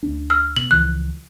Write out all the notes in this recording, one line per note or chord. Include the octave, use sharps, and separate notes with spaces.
D2 D4
E6 F6
B2 F#7
C#2 E3 F3 F#6